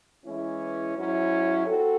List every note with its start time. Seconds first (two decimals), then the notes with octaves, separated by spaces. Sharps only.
0.25 E3 G#3 C#4 E4
0.95 G#2 F#3 C#4 E4
1.65 C4 F#4 A4